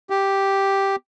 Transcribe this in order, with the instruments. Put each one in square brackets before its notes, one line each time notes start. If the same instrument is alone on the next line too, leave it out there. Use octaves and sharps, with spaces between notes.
[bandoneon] G4